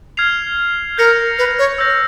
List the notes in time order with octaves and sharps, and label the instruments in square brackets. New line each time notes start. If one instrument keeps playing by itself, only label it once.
[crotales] F6 G#6 C7 F7
[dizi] A#4 [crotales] G6 A#6 C#7 F7
[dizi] B4
C#5
[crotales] E6 G6 A#6